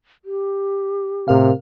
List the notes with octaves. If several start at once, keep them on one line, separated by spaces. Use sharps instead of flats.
G4
A2 C3 A#4 F5